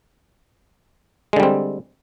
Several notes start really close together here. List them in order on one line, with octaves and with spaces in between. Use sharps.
G#3 D3 G3 C4